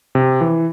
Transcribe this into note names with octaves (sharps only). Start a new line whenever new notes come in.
C3
E3